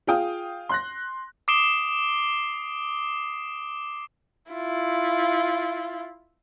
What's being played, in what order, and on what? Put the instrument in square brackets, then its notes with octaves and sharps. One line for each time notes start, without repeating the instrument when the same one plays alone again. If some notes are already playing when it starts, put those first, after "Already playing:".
[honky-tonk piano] F4 G#4 F5 G5 D#6
C6 F#6 A#6
[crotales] D6 D#6 C7 D7 E7 G7
[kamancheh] E4 F4